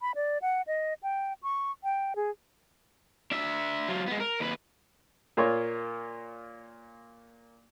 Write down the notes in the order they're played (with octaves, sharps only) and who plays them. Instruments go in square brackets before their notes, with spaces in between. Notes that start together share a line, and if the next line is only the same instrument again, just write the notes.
[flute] B5
D5
F#5
D#5
G5
C#6
G5
G#4
[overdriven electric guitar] D4 E5
F#3 F4
G#3 B3
A#4
D#2 B4
[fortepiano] A#2 A#3 F4 C#5